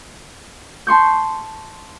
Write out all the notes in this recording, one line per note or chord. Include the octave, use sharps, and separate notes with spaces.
A5 C6 C#6 G6